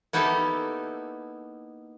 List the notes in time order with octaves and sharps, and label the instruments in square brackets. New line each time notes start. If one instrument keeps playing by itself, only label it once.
[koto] A#3 B3 D#4 E4 G4 A4